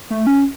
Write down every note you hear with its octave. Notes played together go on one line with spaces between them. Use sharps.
A3
C#4